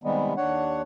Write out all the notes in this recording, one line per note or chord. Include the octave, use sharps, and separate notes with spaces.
C3 D#3 G3 G#3 B3
D#2 D4 C#5 F#5